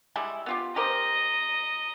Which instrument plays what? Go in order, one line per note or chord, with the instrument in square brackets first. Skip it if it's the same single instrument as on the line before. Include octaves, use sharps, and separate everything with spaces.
[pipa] G3 G#3 E4
B3 F4 G4
[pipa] G4 A#4 C5 [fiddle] D#5 A#5